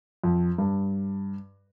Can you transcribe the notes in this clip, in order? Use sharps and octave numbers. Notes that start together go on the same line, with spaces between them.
F2
G2